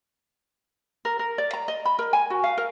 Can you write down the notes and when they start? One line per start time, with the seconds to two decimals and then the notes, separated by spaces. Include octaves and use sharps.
1.05 A#4
1.19 A#4
1.38 D5
1.53 A#5
1.68 D#5
1.85 B5
1.99 A#4
2.13 G#5
2.30 F#4
2.44 F5
2.58 A#4